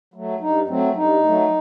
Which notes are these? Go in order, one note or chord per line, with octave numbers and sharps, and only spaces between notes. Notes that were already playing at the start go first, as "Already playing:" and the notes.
F#3 A3
G2 D#4
F#3 A3 C4
G2 D#4
F#3 A3